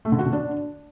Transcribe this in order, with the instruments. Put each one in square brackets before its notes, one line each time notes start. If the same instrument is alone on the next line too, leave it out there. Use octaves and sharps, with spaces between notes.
[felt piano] A3
D3
F#4
D3
D4